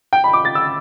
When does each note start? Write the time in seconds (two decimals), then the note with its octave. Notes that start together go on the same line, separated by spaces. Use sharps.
0.13 G5
0.24 B5
0.33 D6
0.45 A6
0.55 E6